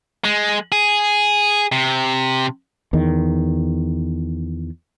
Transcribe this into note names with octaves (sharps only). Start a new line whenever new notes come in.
G#3
G#4
C3
E2 D#3